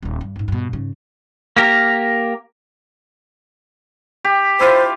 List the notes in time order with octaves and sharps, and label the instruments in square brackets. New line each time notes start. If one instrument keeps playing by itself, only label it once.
[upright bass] D#1 D#4
G2
C#2 G#2
G2 B2
G#2 C#3
[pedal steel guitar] A#3 G4 A#4
[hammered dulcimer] G4
[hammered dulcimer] E4 F4 [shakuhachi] C5